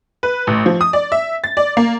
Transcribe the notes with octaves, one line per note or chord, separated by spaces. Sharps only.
B4
A1
F3
D#6
D5
E5
A6
D5
A#3